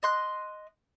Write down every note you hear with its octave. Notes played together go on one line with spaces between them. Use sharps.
D#5 C6 F#6